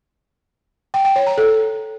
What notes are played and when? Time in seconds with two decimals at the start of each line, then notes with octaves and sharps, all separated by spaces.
0.94 G5
1.05 G5
1.16 C#5
1.27 A#5
1.38 A4